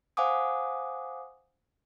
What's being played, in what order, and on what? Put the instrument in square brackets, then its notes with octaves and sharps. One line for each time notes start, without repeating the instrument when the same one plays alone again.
[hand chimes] C5 F5 F#5 G#5 D6 D#6